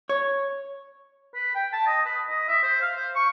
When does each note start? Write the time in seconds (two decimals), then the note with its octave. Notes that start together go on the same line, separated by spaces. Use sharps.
0.09 C#5
1.35 B4
1.55 G5
1.73 A5
1.86 D#5
2.05 B4
2.29 D#5
2.48 E5
2.63 C5
2.81 F5
2.96 C5
3.15 C#6